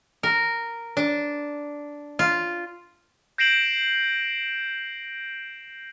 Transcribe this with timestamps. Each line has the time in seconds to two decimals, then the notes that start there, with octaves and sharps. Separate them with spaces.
0.23 A#4
0.97 D4
2.19 F4
3.38 G6 A#6 C7 D7 E7 F#7